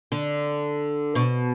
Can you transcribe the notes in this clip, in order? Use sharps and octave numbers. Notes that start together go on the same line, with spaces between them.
D3
B2